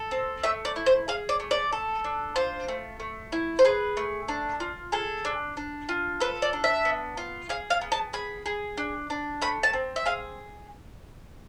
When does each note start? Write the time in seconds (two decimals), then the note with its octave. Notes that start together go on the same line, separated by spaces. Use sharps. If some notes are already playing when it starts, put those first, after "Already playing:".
Already playing: A4
0.11 C4
0.43 A3 E5
0.65 D5
0.76 E4
0.86 C5
1.08 G#4 F5
1.29 D5
1.40 A3
1.51 D5
1.72 A4
2.04 D4
2.36 F4 C5
2.68 A3
3.00 A3
3.32 E4
3.59 C5
3.65 G#4 B4
3.97 A3
4.28 D4
4.60 F4
4.92 G#4 A4
5.25 D4
5.57 D4
5.89 F4
6.20 A4 B4
6.42 D5
6.53 D4
6.64 E5
6.85 B3
7.17 F4
7.49 G#4 F5
7.70 F5
7.81 B3
7.92 A5
8.13 G#4 B5
8.46 G#4
8.77 D4
9.10 D4
9.42 A3 B5
9.63 A5
9.73 C4
9.96 E5
10.06 G#4 F5